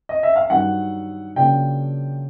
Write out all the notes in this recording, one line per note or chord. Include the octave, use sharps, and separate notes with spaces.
D#5
E5
F5
G2 D#3 F#3 F#5
C#3 F#3 A#3 D4 F4 G5